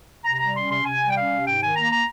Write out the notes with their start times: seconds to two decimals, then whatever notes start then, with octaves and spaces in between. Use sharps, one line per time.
0.23 C3 A#5
0.39 G3 A#5
0.54 C#4 C6
0.69 C3 C6
0.84 C3 G#5
1.00 G3
1.10 G5
1.15 C#4 F5
1.30 C3
1.45 G#2 G5
1.61 D#3 G#5
1.76 A#3 A#5
1.91 A#5